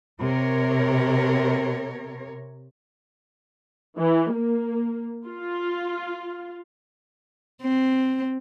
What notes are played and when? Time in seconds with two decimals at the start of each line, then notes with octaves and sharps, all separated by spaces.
0.20 C3 A#4 C#5
3.99 E3
4.33 A#3
5.26 F4
7.62 C4